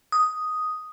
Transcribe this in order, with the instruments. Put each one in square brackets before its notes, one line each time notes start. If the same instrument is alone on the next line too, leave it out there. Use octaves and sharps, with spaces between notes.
[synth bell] D#6